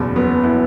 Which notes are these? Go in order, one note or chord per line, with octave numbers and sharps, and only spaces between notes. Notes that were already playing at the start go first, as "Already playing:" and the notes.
Already playing: F#1 E2 B2
F#3 B3
B3 E4